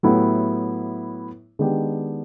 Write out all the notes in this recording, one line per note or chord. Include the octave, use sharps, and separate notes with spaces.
A2 F#3 B3 E4 G4
D#3 G#3 B3 D4 G4